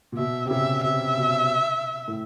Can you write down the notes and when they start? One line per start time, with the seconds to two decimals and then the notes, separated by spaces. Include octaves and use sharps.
0.12 A#2
0.18 B2 E5
0.46 C3
0.51 C#3 E5
0.84 C3 E5
1.18 B2
2.08 A2